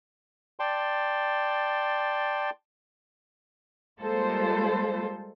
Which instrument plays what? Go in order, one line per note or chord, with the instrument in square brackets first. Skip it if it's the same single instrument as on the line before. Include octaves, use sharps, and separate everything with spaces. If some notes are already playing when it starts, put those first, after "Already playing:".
[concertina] D5 G5 A5 C6
[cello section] G3 G#3 A#3 F4 A4 C5